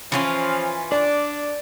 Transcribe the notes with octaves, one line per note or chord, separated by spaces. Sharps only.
E3 F3 C#4 F4
D4 D5